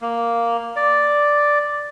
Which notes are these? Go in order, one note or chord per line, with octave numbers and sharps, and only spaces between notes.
A#3
D5